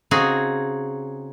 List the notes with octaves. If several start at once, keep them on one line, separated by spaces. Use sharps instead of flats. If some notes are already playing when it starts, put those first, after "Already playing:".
C#3 C4 D#4 F#4 G#4